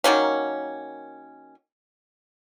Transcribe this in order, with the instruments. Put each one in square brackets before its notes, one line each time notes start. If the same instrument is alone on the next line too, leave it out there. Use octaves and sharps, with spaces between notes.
[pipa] D#3 F#3 A#3 C#4